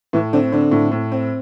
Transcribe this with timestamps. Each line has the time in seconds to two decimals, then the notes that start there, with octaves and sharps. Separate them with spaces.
0.13 A2 E3
0.33 D3 C4
0.52 D3 C4
0.71 A2
0.92 A2
1.12 C4